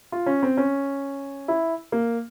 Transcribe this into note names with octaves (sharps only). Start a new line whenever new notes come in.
F4
C#4
C4
C#4
E4
A#3